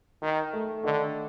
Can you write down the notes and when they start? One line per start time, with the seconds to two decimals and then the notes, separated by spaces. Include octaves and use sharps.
0.22 D#3 D#4
0.53 A3
0.84 D3 D#3